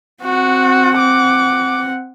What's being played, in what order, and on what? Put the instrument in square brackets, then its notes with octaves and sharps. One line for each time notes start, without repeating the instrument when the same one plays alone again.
[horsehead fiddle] C4 F#5 [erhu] F#4
[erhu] D6